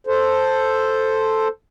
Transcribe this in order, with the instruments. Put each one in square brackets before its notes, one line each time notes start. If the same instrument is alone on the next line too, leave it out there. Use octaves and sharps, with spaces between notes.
[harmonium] A4 C5